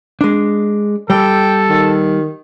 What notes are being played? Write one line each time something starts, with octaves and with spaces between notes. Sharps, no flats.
G#3 D4
G3 A4 G5
D#3